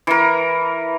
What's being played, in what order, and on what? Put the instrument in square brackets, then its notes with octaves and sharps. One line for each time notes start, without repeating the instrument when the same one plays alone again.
[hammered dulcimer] E3 A#4